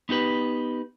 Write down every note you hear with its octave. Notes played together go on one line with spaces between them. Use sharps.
B3 D#4 G4 B4